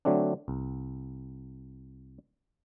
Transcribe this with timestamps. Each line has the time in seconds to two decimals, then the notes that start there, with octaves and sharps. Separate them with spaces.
0.05 D3 F#3 A3 C4 D4
0.48 C2